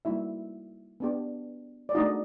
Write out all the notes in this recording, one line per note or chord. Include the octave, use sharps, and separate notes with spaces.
G3 A#3 D#4 E4 F#4 E5
B3 D4 G4
D5
A3 D4 D#4 F#4 D#5